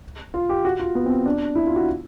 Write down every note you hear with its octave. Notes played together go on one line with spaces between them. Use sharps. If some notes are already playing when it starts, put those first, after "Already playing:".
F4
G4
F#4
F4
B3
C4
D4
E4
F4
F#4